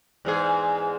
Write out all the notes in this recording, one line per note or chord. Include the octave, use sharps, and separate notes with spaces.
E2 G#2 G#4